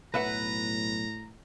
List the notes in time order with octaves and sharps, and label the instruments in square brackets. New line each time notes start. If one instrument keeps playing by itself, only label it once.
[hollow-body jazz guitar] B1 E5 F#5 [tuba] A2 [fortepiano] B4 [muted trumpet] A#5